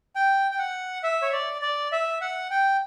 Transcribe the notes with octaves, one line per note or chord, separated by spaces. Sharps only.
G5
G5
F#5
E5
C#5
D5
D5
E5
F#5
G5